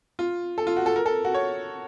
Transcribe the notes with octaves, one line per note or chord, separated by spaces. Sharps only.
F4
A4
F4
F#4
A4
A#4
A4
F#4
C#5